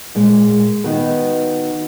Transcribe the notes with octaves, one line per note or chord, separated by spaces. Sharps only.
A#2 G#3
D#3 B3 F#4 B4